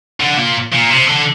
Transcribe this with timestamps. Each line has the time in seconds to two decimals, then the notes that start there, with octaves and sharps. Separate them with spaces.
0.20 D3
0.37 A#2
0.72 A#2
0.90 C3
1.07 D3